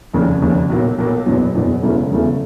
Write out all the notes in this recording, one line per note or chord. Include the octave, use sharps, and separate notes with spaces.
F1 D#2 C#3
F1 D#2 C#3
B1 A#2 F#3 A#3
B1 A#2 F#3 A#3
F#1 E2 B2 F#3
F#1 E2 B2 F#3
E1 E2 C#3 F#3 A3
E1 E2 C#3 F#3 A3